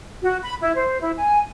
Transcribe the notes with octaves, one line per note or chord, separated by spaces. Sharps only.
F#4
B5
E4
C5
E4
G#5